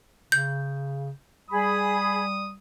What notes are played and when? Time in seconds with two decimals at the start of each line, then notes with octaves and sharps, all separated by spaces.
0.32 C#3 G6
1.50 G3 G#4 B5 D#6